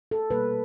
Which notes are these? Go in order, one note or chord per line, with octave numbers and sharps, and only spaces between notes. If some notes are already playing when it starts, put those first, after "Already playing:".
A4
B2 G3 A#3 B4